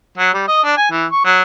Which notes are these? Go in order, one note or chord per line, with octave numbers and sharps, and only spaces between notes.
F#3
G3
D#5
D4
G#5
E3
C#6
F#3